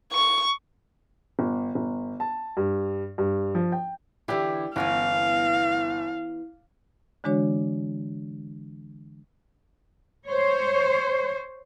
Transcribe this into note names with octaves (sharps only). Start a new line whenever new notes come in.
C#6
G1
G1
A5
G2
G2
F3
G5
D3 E3 E4 G4
G1 E3 B3 C#4 F5
D3 E3 G#3 D4 F#4 C#5
C5 C#5